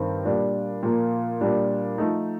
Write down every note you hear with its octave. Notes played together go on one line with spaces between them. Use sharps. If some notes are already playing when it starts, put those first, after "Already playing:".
Already playing: G2 D#3 C4 D#4
A#2 G3 D4
A#2 F3 A#3
A#2 G3 D4
F3 A3 D#4